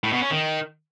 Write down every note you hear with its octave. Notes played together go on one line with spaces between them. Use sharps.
A2
B2
C#4
D#3